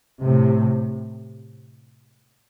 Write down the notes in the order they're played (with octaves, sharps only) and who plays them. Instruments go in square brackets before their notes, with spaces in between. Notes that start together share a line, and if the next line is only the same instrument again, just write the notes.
[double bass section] A2 C3